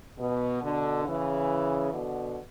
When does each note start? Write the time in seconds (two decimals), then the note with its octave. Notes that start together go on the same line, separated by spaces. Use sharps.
0.18 B2
0.61 B2 D3
1.05 C#3 E3
1.92 B2 D3